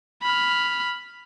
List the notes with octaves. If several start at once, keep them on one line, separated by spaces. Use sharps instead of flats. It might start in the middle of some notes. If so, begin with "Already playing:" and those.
B5 F6